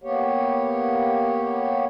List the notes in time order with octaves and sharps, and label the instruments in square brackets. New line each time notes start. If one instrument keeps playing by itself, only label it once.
[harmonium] A#3 B3 G4 C#5